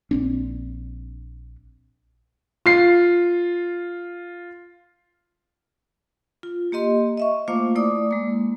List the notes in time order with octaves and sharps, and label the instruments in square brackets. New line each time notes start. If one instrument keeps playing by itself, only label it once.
[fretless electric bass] A#1 C4 D4
[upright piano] F4 C7
[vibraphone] F4
A#3 G4 D#5 C6
D#5 E5 C#6
A3 A#3 F4 C5 F5 D6
A3 E4 D5 D6 D#6
G#3 A#3